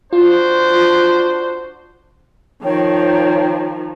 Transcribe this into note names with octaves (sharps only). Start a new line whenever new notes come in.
D4 F4 F#4 C5
D#3 F3 C#5 G5